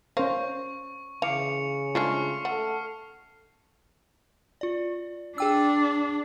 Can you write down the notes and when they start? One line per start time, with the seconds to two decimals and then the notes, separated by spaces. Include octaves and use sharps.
0.17 C#4 A#4 C5 F5 C#6
1.22 C#3 E3 F5 D6 C#7 F7
1.95 G#3 A3 D4 F4 C#6 F6 C7
2.45 A3 A4 F#5
4.61 F4 D5
5.38 D4 G#4 G5 E6